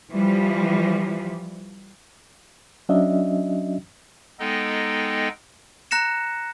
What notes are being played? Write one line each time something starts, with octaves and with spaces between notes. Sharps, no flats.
E3 F3 G3
F#3 C#4 D4 F#4 D#5 E5
G#3 B3 D#4 A4 D#5 G5
A#5 F#6 A#6 C#7 E7